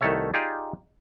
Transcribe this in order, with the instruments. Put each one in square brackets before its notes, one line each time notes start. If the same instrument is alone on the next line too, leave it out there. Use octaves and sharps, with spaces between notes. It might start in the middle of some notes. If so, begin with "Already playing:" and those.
[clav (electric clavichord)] C2 D#3 A3 A4 C#5 E5
D#4 F4 G4 G#4 D5